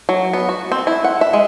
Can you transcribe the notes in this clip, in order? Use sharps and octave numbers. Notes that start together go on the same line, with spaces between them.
F#3
B3
F#4
C4
E4
F#5
E5
G#3